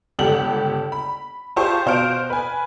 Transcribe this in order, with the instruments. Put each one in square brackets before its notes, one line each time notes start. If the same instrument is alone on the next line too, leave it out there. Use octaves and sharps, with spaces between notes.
[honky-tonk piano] G1 C#2 G4 A4 F#5 F#7
B5
F4 G4 G#4 C5 A5 C#6
B2 C5 F5 F6 D7
B4 G#5